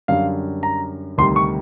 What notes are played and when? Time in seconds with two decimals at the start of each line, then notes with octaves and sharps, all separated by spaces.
0.08 F#2 D3 G3 F5
0.63 A#5
1.18 D2 C3 D#3 G3 C6
1.36 C#6